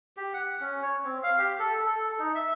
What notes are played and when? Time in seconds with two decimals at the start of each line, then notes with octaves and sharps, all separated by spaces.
0.17 G4
0.33 F#5
0.61 C#4
0.82 C#5
1.04 C4
1.23 F5
1.38 G4
1.59 A4
1.86 A4
2.19 D#4
2.35 E5